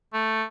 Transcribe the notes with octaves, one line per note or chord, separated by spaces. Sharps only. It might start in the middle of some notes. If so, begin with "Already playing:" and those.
A3